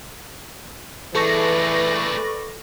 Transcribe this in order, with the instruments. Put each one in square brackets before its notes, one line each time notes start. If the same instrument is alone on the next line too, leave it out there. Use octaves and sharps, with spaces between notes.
[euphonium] E3 [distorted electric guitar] A3 G#4 [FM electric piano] A4 C#6 A#6 [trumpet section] B4 D5